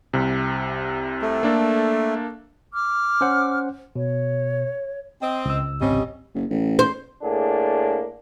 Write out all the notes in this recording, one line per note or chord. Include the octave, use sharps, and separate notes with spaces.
C2 C3
A3
A#3 D4 A4
D6 F6
C#4 C5 F#5
B2 C#5
C4 D#5
C#2 E6
G#1 C3 G3 C#4 D#5
F#1
A1
C5
A2 A#3 D4 G#4